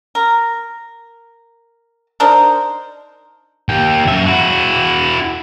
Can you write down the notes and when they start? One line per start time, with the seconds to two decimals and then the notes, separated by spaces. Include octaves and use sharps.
0.15 A#4
2.20 D4 D#4 A#4 C5
3.69 D#2 G5
4.08 F#2 E5
4.26 E4 F#4